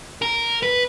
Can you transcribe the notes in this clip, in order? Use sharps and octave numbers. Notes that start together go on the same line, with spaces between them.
A#4
B4